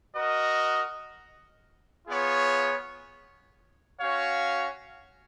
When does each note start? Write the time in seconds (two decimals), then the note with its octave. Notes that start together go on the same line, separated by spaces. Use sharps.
0.14 F#4 A#4 D#5
2.07 B3 F4 G#4 C#5
4.00 C#4 F#4 C#5 F5